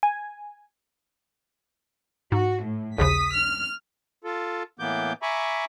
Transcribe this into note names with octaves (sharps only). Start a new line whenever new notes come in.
G#5
G#2 F#4
A2
A#1 D#2 C#3 D#6 B6
F6
F4 A4
A2 E3 A#3 B3 D6 G6
E5 G#5 A#5 B5 C#6 D6